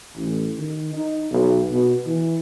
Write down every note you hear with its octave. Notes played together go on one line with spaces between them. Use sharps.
A1
D#3
D#4
B1
B2
E3